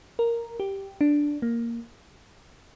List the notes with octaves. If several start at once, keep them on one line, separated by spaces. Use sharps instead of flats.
A#4
G4
D4
A#3